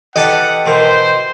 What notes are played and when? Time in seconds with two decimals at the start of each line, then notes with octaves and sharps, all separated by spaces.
0.16 E3 G4 A4 D#5 F#5 G5 A5
0.66 B2 E3 A#4 C5